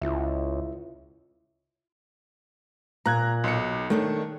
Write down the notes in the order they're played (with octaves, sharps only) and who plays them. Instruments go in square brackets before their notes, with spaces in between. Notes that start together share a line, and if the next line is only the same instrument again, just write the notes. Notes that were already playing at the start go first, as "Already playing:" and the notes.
[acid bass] C#2 [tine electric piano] E4 F4 E5
[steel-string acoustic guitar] A#2 [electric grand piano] A#5 F#6 G#6
[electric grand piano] B1 C#7
[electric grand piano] D#3 [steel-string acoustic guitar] A3 D4 C#5